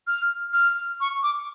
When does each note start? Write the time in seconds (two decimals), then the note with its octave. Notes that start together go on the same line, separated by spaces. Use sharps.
0.07 F6
0.53 F6
1.01 C#6
1.23 D6